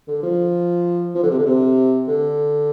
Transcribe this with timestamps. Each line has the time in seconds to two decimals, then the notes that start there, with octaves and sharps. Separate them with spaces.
0.08 D3
0.23 F3
1.15 F3
1.23 D3
1.31 C3
1.39 D3
1.46 C3
2.08 D3